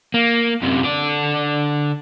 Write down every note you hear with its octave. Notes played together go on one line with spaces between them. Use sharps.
A#3
F#2 C3
D3 D5